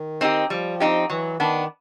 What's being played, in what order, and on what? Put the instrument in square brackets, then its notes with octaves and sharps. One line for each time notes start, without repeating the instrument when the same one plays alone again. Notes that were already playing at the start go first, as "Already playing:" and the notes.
Already playing: [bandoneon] D#3
[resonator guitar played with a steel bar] C4 D#4 G4
[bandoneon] F3 [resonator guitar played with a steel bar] G3
[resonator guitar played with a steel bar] C4 D#4 G4
[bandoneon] E3 [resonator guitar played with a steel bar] F#3
[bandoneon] D#3 [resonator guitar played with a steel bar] B3 D4